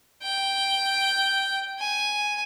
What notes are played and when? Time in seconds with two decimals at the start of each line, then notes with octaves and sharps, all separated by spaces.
0.23 G5
1.79 G#5